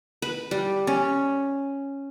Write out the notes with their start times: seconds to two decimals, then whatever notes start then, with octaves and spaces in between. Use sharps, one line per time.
0.22 B4
0.51 G3
0.87 C#4